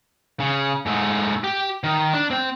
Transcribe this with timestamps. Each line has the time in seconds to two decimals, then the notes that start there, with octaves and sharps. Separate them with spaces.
0.40 C#3
0.86 G#2 A3
1.44 G4
1.84 D#3
2.13 D4
2.31 C4 G5